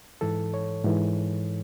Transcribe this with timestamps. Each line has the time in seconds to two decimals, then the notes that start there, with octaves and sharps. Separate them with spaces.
0.21 G#2 E3 A4
0.54 C#5
0.85 G#2 E3